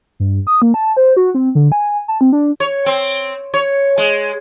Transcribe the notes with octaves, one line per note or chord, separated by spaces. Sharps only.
G2
D#6
A#3
A5
C5
F#4
C4
D3
G#5
A5
C4
D4
C#5
C4
C#5
G#3